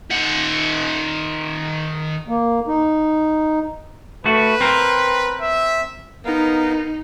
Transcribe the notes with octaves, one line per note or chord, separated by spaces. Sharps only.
D#3 F#5
A#3
D#4
A3 F#4 B4
C4 A#4
E5
B3 D#4 A#4 F5